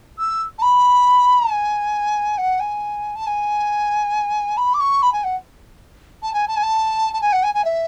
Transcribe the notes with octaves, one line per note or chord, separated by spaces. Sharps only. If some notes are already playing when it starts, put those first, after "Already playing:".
E6
A5
B5
G#5
F#5
G#5
A5
G#5
B5
D6
C#6
B5
G#5
F#5
A5
G#5
A5
G#5
A5
A5
G#5
F#5
G#5
G#5
E5